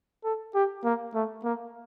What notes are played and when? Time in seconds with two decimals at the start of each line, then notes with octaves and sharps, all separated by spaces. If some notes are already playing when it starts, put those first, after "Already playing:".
0.24 A4
0.55 G4
0.84 A#3
1.14 A3
1.44 A#3